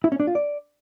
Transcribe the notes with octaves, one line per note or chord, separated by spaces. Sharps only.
E4
C#4
D4
F4
D5